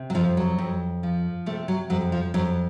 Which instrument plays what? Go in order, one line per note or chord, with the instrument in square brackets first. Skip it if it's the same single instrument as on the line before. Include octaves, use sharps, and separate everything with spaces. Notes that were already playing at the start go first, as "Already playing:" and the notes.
Already playing: [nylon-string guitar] C3
F#3
F2 F3
F#3
F2
F3
C3 A3
F#3
F2 F#3
F3
F2 F#3